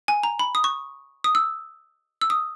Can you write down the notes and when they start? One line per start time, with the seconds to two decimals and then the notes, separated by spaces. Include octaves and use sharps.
0.08 G#5
0.23 A#5
0.39 B5
0.55 D#6
0.64 C#6
1.24 D#6
1.35 E6
2.22 E6
2.30 D#6